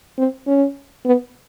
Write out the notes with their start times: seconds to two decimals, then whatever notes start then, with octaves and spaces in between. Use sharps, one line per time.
0.18 C4
0.47 C#4
1.06 B3